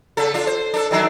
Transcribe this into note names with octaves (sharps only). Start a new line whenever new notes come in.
C#3 A4
D4 F4
C5
D4 A4
D#3 F#3 D4